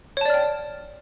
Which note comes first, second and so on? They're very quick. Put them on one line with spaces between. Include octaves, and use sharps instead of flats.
C#5 A5 D5 F6 G5